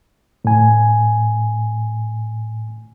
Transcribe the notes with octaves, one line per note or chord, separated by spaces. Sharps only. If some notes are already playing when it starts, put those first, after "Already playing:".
A2 G#5